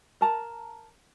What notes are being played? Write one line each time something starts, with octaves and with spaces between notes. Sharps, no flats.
A#4 A5 A#5